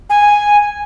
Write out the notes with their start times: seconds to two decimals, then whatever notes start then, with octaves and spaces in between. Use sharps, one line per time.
0.10 G#5